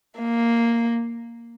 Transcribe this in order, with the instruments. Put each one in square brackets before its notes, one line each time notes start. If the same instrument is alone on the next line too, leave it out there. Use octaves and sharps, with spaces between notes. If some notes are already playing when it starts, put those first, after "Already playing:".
[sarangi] A#3